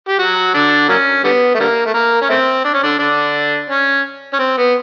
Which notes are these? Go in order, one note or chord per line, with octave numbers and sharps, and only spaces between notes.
G4
F#3 F#4
D3 D4
F#3 A#3 C#4
D3 G3 B3
A3
D3 G3 A#3
A3
A#3
C#4
A3 C4
D4
C#4
D3 D4
D3 D4
C#4
C#4
C4
B3